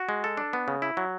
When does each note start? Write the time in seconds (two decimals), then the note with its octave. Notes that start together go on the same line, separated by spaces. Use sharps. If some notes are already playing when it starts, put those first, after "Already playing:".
Already playing: F#4
0.09 G#3
0.24 A4
0.37 D4
0.53 B3
0.68 C#3
0.82 E4
0.97 F#3